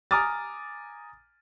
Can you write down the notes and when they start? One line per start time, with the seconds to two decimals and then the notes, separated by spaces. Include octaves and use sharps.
0.11 G#5 A#5 D6 D#6 F6 A6